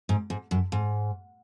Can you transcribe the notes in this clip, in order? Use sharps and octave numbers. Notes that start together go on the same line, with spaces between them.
G#2
G#2
F#2
G#2